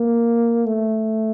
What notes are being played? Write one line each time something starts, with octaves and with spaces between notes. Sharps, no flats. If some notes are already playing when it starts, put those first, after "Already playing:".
Already playing: A#3
A3